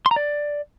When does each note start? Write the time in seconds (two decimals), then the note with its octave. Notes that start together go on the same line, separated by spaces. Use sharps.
0.06 C6
0.11 A#5
0.16 D5